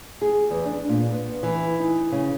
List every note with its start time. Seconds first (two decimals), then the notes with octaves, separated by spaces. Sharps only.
0.21 G#4
0.50 E2
0.65 D4
0.89 A#2
1.10 B3
1.43 E3
1.80 D#4
2.12 C#3